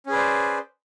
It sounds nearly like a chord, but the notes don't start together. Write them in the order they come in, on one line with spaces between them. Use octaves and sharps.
C#4 G#4 B4 D5 C5